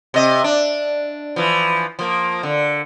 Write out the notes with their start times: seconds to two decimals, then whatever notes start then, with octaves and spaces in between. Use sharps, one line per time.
0.14 C3 D#5
0.44 D4
1.36 E3 F3
1.99 F3 A#3
2.43 D3